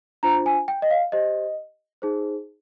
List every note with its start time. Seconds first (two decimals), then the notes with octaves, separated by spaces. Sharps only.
0.23 D4 F4 C5 A#5
0.46 G#5
0.68 G5
0.82 D#5
0.90 F5
1.12 G4 C5 D#5
2.02 D#4 G#4 C5